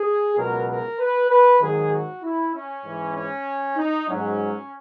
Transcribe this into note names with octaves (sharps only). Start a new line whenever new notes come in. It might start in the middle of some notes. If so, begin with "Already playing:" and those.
Already playing: G#4
C#2 B2 F#3 A#4
A#4
B4
B4
G#2 D#3 F#3 G#4
F#4
E4
C#4
G#2 E3
C#4
D#4
G#2 F#3 C#4